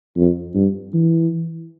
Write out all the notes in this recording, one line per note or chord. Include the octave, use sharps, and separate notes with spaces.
F2
G2
E3